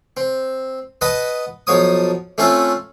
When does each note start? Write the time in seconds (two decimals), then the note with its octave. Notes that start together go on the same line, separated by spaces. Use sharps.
0.17 C4
1.01 B4 D#5 F#5 A5 B5
1.67 B1 F3 C#5 D#6
2.38 A3 C4 C#4 F4 A4